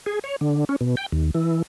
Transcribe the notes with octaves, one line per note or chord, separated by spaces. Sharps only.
G#4
C#5
D3
C#4
B2
G5
D#2
E3